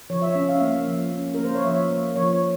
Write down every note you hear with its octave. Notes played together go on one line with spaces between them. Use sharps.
F3 C#5
E5
C#4
F5
A#3 E5
F5
F3
C#4
A#3 A#4
C5
C#5
F3 E5
A#3
F3 C#5